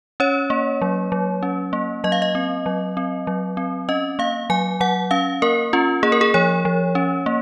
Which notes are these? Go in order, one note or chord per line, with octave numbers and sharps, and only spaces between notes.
C#4 C#5
A#3
F#3
F#3
C#4
A#3
F#3 D#5
F5
D#5
C4
F#3
C4
F#3
C4
C#4 D#5
A#3 F5
F#3 G#5
F#3 F#5
C#4 F5
A#3 A#4
C#4 F4
A#3 G#4
A#4
G#4
F3 C#5
F3
C#4
A#3